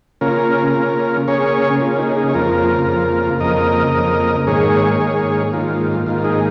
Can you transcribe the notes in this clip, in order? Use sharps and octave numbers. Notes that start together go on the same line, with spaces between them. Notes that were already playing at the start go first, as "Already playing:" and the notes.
C#3 A#3 C#4 F4 A#4
C#3 A#3 C#4
C#3 A#3 C#4 G#4 C#5
C#3 A#3 C#4 F4
D#4 G#4
D#4 G#4
C#5
F2 C#3 A#3 F4 A#4
F2 C#3 A#3
F2 C#3 A#3 A#4 D#5
F2 C#3 A#3
G#2 D#3 A#3 G#4 C#5
G#2 D#3 A#3
G#2 D#3 A#3 F4
G#2 D#3 A#3 F4
D#4 G#4